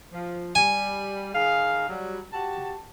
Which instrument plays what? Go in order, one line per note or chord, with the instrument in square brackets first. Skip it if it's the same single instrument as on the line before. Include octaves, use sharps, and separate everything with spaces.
[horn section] F3
[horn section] G3 [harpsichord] G#5
[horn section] D#3 G#4 F5
F#3 G3
F#4 G4 A5